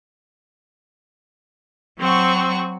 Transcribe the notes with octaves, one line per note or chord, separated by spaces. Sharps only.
F#3 C4 F#4 C#6